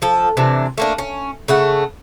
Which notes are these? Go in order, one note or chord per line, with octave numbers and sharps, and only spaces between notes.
F3 A4
C3 E3 D4
A3 A#3 D4
C#4
C#3 A3 F#5